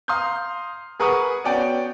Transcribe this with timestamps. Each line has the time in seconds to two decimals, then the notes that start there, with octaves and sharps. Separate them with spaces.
0.08 F5 A#5 C6 D#6 F6 G6
1.00 G#4 A#4 B4 F#5 C#6 D#6
1.44 B3 C#4 F#4 D5 F#5 G5